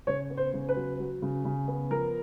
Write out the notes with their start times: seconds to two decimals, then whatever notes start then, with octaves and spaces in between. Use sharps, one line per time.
0.07 C#3 C#5
0.30 B3
0.37 C5
0.54 C#3
0.69 B4
0.76 F#3
0.99 F#3
1.22 C#3
1.45 C#3
1.68 B3
1.90 F3 A#4